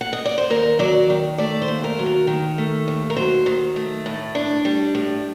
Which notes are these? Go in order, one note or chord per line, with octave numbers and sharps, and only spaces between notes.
F#5
D#5
D5
C5
D#2 A#4
F#3 D5
D#3
A3 D5
C5
D#2
A#4
F#3
A#4
D#3
A3
D#2
A#4
F#3 C5
D#3
A3
A2
D4
G3
A2